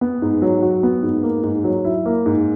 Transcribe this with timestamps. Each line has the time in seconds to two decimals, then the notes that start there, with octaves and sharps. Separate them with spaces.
0.01 B3
0.22 G#2
0.42 F#3
0.62 F#4
0.83 B3
1.03 G#2
1.23 A#3
1.43 G#2
1.64 F#3
1.84 E4
2.05 A#3
2.26 G#2